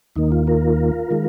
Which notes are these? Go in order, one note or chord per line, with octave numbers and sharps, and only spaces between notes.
D#2 D#3 A#3 D#4
F4
F4 A#4
D#3 G#3